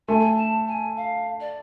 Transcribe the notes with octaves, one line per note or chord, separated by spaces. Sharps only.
A3 G#5
A5
G#5
F5
D5